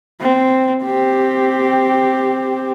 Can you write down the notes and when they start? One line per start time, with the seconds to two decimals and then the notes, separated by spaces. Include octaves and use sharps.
0.21 C4
0.84 C4 G4